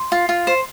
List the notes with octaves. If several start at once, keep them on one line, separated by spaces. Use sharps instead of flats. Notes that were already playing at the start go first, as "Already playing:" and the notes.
Already playing: C6
F4
F4
C5